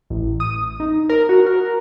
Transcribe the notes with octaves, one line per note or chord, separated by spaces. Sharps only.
A1
D#6
D#4
A#4
F#4
A#4